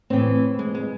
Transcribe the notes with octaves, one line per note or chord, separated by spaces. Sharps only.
A2 E3 C4
G#3
G#3